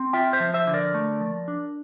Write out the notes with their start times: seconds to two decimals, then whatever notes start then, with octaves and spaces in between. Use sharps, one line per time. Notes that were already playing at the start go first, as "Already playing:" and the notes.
Already playing: C4
0.13 F4 E5 G5
0.33 C5 E5
0.40 F3
0.54 C5 E5
0.67 D3
0.74 A#4 D5
0.94 A3
1.21 F3
1.48 D4